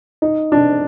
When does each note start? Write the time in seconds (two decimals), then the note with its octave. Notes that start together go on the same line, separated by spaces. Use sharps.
0.22 D#4
0.52 D4